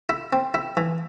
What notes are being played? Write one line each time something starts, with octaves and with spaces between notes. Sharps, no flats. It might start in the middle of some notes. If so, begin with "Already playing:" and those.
E4
C4
E4
E3